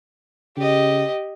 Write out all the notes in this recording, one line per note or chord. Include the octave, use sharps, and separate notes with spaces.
C#3 G4 D#5